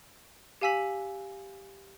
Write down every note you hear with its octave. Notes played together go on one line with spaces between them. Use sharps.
G4 F5 G#5 E6 B6 F#7